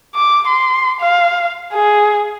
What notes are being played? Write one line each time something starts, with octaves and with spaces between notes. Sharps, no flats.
D6
C6
F5
G#4